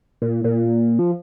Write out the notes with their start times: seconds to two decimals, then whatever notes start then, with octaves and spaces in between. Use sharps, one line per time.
0.22 A#2
0.44 A#2
0.99 F3